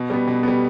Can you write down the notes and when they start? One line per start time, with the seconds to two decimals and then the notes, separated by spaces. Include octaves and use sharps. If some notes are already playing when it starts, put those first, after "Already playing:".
Already playing: B2
0.10 G3 B3
0.27 B2
0.43 G3 B3